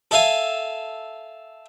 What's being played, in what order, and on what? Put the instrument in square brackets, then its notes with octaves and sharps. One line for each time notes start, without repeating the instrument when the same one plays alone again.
[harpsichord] A4 E5 F5 G#5